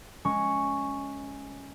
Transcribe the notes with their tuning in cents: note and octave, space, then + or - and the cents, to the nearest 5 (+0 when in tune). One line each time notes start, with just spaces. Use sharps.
G#3 +0 C#4 +0 C#6 +0